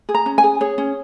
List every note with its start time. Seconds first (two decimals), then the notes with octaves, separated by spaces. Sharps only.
0.09 G#4
0.15 A#5
0.26 C#4
0.38 G#5
0.44 G#4
0.61 G#4 C#5
0.78 C#4